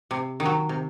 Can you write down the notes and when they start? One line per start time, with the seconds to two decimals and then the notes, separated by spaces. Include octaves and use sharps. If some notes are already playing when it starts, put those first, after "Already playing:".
0.11 C3
0.40 D#3
0.45 F#3
0.69 C3